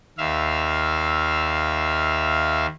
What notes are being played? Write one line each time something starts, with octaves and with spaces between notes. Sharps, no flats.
D#2 E5 F5